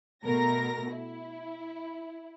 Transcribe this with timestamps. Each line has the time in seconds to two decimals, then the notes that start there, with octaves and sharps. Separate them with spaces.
0.24 B2 A3 A#4 A#6
0.93 E4